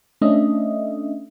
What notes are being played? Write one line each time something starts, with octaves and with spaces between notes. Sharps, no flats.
A3 C#4 D4 D#5 E5